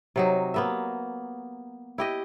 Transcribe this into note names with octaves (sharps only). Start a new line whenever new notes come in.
C3 F#3 D#4
A#3 B3 E5
E4 G4 D#5